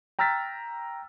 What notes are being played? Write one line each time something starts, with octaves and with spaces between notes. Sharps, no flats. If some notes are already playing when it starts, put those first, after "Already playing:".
G5 A#5 E6 F6 A6 B6